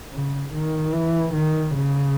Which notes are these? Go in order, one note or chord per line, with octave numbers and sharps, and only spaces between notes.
C#3
D#3
E3
D#3
C#3